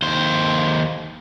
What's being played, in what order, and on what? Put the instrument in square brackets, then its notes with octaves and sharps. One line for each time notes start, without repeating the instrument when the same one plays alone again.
[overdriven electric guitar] D#2 C5